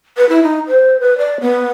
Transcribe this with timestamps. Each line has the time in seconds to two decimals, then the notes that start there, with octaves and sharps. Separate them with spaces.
0.17 B4
0.29 E4
0.43 D#4
0.68 C5
1.00 B4
1.18 D5
1.41 B3